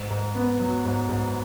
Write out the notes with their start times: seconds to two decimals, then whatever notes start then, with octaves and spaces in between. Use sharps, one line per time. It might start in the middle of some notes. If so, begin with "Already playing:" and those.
Already playing: G#2
0.10 G#2
0.35 B3
0.60 F#3
0.85 G#2
1.09 G#2